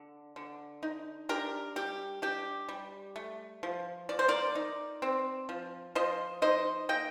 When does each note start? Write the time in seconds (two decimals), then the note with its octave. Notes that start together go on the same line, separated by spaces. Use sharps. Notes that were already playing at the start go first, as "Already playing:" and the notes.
Already playing: D3
0.36 D3
0.83 D#4
1.29 D4 G4 A#4
1.76 G3 G4
2.22 D4 G4
2.69 G3
3.16 A3
3.63 F3
4.09 F3 D5
4.19 C5
4.28 A#4 D5
4.55 D#4
5.02 C4
5.49 F3
5.95 F3 C5 D#5
6.42 D#4 C5 D#5
6.89 A#3 D#5 G5